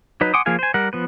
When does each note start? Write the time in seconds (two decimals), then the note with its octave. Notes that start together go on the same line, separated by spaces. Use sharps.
0.21 F#3 D#4 B4
0.34 F#5 G#5 C6 D6 D#6
0.46 F3 A#3 G#4 F5 G#5
0.59 C5 G#5
0.74 G3 A#4 F#5
0.93 F3 B3 B4